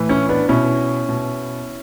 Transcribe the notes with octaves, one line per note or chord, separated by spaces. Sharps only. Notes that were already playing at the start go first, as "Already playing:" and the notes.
Already playing: A2 E3
C#4 E4
B3 D4
B2 C#4 E4
B2